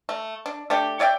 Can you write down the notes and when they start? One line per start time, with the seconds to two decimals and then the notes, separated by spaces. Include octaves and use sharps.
0.09 A3
0.46 D4
0.70 A3 D4 G4
1.00 C#5 D5 E5 G5